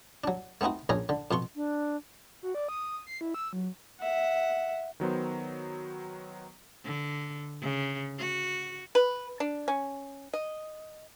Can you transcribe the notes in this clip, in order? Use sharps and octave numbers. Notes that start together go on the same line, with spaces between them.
F#3 D4
A3 B3 C4 D#4 F#4
A#1 C#4 G#4 A#5
D3
F2 B2 C6 C#6
D4
F#4
D5
D#6
C7
E4
E6
F#3
E5 F#5
D#3 F#3 B3 C5
D3
C#3
F#4
B4
D4
C#4
D#5